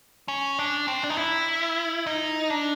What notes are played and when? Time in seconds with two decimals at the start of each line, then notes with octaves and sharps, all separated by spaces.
0.28 C#4
0.59 D4
0.88 C4
1.03 D4
1.10 D#4
1.17 E4
2.07 D#4
2.50 D4